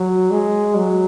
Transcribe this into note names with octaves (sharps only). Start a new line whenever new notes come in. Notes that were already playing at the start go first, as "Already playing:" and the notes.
Already playing: F#3
G#3
F#3